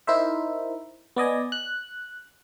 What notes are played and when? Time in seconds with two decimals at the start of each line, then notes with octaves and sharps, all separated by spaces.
0.07 D#4 E4 A#4 C5 E5
1.16 B3 D5 D#5 G#5
1.52 F#6